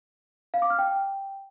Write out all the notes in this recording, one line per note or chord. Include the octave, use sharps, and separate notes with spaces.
F5
D6
F6
G5